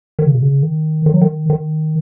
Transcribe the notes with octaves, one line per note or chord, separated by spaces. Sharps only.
D#3
C#3
B2
C#3
D#3
D#3
F#3
D#3
D#3